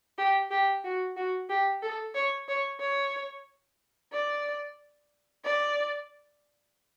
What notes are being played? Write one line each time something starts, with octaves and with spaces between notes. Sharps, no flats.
G4
G4
F#4
F#4
G4
A4
C#5
C#5
C#5
D5
D5